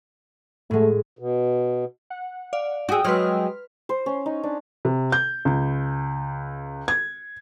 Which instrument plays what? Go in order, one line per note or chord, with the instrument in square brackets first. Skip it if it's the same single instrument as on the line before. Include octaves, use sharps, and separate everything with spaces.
[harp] A2 G#3 [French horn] A3
[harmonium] B2
[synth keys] F#5
[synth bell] D5 F5
[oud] F#4 G#4 [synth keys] G5 D#6 E6
[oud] F#3 G#3 [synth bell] B4 C6 F6
[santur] C5
C#4
D#4
D4
[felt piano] C3
G6
C#2
G#6